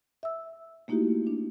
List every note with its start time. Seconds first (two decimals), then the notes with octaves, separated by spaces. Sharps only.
0.23 E5 E6
0.88 A3 A#3 D#4 E4 F#4 G4
1.27 D4